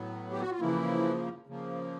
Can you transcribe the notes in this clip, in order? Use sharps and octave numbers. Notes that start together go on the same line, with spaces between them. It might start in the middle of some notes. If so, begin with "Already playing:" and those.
Already playing: A2 F#3 B3
G4
F#4
F4
C#3 E3 F3 A#3 E4
C#3 F3 A#3